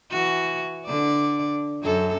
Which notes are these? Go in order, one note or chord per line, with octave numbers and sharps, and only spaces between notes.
E3 F#4
D3 D5
F#2 A4